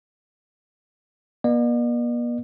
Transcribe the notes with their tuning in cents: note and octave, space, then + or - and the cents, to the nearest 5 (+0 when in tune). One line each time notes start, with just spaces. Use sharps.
A#3 +45 D5 +45